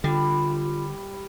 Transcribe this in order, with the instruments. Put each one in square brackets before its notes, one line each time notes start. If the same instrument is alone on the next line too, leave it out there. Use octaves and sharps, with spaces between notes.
[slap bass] D3 [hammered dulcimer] G3 [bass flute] F4